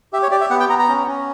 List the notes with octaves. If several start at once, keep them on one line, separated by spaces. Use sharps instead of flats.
G4 E5
C#5
G4 D5
E5
B3 F#5
G5
B3 A#5
A#5
C#4
C#4